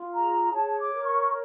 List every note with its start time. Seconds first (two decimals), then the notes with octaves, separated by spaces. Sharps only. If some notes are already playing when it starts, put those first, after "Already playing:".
Already playing: F4
0.14 G#4 A#5
0.53 C#5 A5
0.79 D6
0.93 A#4
1.05 C#6